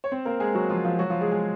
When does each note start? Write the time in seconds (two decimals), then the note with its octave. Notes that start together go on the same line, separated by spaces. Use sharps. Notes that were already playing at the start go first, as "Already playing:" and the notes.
0.04 C#5
0.12 C4 C5
0.25 A#3 A#4
0.40 G#3 G#4
0.54 F#3 F#4
0.69 F3 F4
0.84 F3 F4
0.99 F#3 F#4
1.10 F3 F4
1.21 G#3 G#4
1.31 G#3 G#4